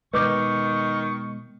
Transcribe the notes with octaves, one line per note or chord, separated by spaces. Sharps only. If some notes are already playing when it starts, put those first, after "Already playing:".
B2 D#3 G#3 B4 C#6 D6 G6